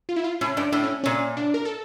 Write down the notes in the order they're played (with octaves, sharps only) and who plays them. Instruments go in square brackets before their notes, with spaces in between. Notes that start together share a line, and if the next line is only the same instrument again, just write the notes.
[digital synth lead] F4
E4
F4
[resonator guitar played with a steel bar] A2 [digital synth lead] C#4
[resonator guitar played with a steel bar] G2 [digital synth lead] D4
[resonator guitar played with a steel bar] A2 [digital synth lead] D4
[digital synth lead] C#4
[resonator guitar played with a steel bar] A#2 [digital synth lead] C#4
[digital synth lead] D4
A#4
A4